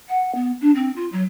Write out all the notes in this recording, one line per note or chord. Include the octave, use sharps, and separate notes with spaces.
F#5
B3
D4
C4
F4
F#3